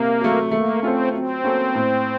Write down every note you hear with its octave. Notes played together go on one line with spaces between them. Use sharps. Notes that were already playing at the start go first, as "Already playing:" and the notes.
Already playing: C3 A#3
F#3 A3
A3 A#3
C4 C#4 F4 A4 C5
F#3 C4
A#3 C#4 F#4 A4
A2